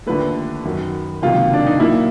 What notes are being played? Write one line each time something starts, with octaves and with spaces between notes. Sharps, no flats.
D#2 D3 F3 A3 B4
F#2 D#3 F#3
C#2 C3 D#3 F#3 A#3 F4
D4
D#4
A#2 F#3 A#3 E4